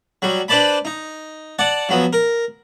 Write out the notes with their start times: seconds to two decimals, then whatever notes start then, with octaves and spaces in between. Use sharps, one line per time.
0.22 F#3 G3
0.48 D4 B4 C5 D5 A5 B5
0.85 D#4
1.59 D5 F#5 A5
1.89 F3 F#3 B3
2.13 A#4